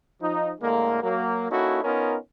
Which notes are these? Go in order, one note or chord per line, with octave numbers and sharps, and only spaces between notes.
F3 D#4
A2 D3 G#3 A#3
F#3 A#3
A#3 C#4 D#4 E4 F#4 A4
B3 C#4 D#4 F4 A#4